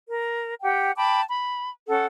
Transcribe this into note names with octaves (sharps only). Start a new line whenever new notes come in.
A#4
G4 F#5 G5
G5 A5 B5 D6
B5
C#4 A4 F#5